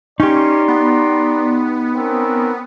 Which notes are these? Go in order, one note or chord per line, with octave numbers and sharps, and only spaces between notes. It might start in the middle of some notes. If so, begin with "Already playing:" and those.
C#4 D#4 G4 D5 A#5 C6
B3
C4 C#4 A#4